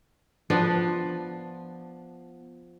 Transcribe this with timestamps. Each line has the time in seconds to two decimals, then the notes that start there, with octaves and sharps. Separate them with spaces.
0.50 F3 B3 D4